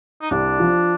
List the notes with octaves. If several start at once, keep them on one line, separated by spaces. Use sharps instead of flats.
D#4
C2 D4
F3